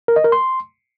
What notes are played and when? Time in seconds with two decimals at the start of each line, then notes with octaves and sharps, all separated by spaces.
0.08 A#4
0.16 D#5
0.24 A#4
0.32 C6